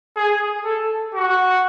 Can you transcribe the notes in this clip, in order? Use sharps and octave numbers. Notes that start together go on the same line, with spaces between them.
G#4
A4
F#4